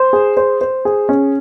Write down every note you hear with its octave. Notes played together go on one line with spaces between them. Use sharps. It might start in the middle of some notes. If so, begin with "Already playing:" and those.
Already playing: C5
G#4
C5
C5
G#4
C#4